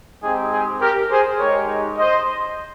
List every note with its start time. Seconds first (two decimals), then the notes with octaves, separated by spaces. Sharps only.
0.23 G#3 C4 D#4 G4 G#4
0.52 G#4
0.81 G4 A#4
1.10 G#4 C5
1.39 G#3 D#4 G4 A#4 C#5
1.98 C5 D#5